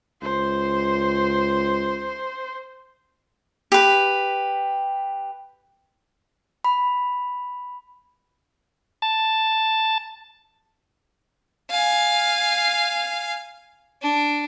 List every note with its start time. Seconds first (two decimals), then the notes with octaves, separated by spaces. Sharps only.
0.22 C#2 C5
3.72 G4 B4
6.64 B5
9.02 A5
11.70 F5 G#5
14.02 D4